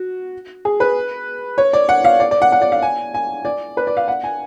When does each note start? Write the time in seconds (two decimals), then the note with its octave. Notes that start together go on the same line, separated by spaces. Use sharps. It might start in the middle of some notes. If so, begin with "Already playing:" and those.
Already playing: F#4
0.65 G#4
0.80 B4
1.58 C#5
1.73 D5
1.89 F#5
2.04 F5
2.20 D5
2.31 D5
2.42 F#5
2.52 F#5
2.62 D5
2.72 F5
2.82 G#5
3.14 G#5
3.45 D5
3.77 B4
3.87 D5
3.97 F5
4.08 F#5
4.24 G#5